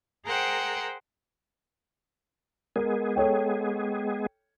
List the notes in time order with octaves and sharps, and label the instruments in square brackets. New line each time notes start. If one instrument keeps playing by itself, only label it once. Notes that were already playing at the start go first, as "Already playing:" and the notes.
[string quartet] G#4 A#4 C5 F#5 G5
[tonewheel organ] G#3 B3 G#4 [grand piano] A#4
[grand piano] A4 C#5 G5